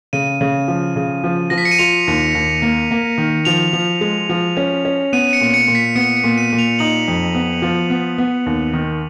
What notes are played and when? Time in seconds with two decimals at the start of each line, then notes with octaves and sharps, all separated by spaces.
0.13 C#3 D#7
0.41 C#3
0.68 F3
0.96 C#3
1.24 F3
1.50 F3 A#6
1.58 B6
1.65 C#7
1.71 D#7
1.79 F4 F7
2.07 D#2
2.35 D#2
2.62 A#3
2.91 A#3
3.18 D#3
3.45 F3 F7
3.73 F3
4.01 G#3
4.29 F3
4.57 C#4
4.85 C#4
5.13 B3 D#7
5.29 D#7
5.33 C#7
5.41 A#2
5.54 C#7
5.68 A#2
5.75 B6
5.95 B3 C#7
6.17 C#7
6.24 A#2
6.38 D#7
6.52 A#2
6.59 F7
6.79 D#4 F#7
7.08 F2
7.35 B3
7.62 F3
7.90 B3
8.18 B3
8.46 D#2
8.73 D#3